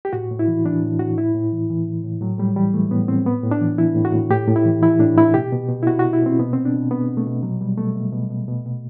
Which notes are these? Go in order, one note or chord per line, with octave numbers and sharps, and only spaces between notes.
G4
A2 F#4
A2
E4
E3
E3 D4
A2
A2 F#4
A2 E4
A2
E3
E3
A2
A2
A2 F#3
A2 G3
E3 G3
E3 A3
A2 B3
A2 C4
A2 B3
A2
D4
E3
E3 E4
A2
F#4
A2
A2 G4
A2
E4
E3
E3 E4
A2 D4
A2 E4
B2 G4
B2
B2
E4
B2 F#4
B2 F#4
E4
B2 C4
B2 B3
B2 C4
D4
B2
B2 B3
B2
A3
B2
B2 F#3
B2 G3
B2 A3
B2
B2
B2
B2
B2